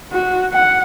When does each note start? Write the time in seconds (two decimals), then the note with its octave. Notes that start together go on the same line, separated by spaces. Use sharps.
0.12 F#4
0.53 F#5